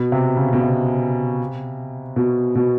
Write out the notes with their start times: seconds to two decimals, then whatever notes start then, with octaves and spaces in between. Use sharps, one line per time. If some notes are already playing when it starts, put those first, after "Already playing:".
Already playing: B2
0.12 C3
0.37 C#3
0.53 B2
0.63 C3
2.16 B2
2.55 B2